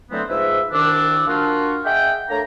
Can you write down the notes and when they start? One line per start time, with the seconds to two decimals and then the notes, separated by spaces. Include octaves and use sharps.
0.11 D3 E3 F#3 A3 B3 C4
0.29 G#2 F3 G#4 B4 E5
0.72 C2 D#3 D4 E6
1.27 A#3 D4 F4 F#4
1.85 G#4 D#5 E5 F#5 G5
2.29 A3 A#3 D4 C#5 A#5